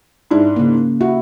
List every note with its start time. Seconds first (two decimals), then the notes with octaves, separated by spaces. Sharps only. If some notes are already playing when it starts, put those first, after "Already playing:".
0.31 G#2 D4 E4
0.56 C#3 A#3
1.01 E4 F#4